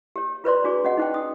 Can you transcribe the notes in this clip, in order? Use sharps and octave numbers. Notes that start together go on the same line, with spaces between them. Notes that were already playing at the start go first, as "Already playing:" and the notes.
G4 C#5
F4 B4 C5 D5 C6
D4 F#4 G#4 D5
C#4 F#4 D#5 F#5
D#4 C5 G5
D#6